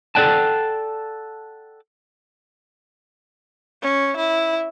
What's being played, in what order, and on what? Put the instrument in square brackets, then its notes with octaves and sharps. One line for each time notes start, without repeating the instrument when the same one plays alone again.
[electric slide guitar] A4 A#4 D5 F#5 G5 A5
[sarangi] C#4
E4